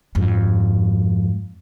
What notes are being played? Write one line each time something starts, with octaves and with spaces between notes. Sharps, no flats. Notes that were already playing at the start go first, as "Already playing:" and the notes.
F2 G#2